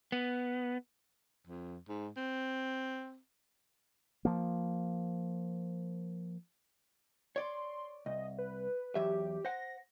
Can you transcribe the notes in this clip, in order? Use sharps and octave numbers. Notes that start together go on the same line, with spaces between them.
B3
F2
G#2
C4
F3 A#3
C#5 D5 C6
C2 D#5
B4
E2 F#3 G4 E5
C5 F#5 A#6